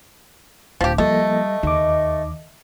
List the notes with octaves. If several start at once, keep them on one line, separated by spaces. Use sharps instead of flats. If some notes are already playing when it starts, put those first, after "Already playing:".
D1 F3 G4
F3 G3 A3 A#3 A4 D#5
D#2 D#3 D6